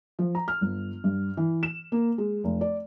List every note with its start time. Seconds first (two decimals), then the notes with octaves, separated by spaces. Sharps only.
0.19 F3
0.35 A#5
0.48 F6
0.61 G1
1.04 G2
1.37 E3
1.63 E7
1.92 A#3
2.18 G#3
2.44 F1
2.61 D5